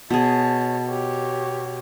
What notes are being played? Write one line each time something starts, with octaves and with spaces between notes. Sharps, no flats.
B2 G#4 C#5 A5
G4 C#5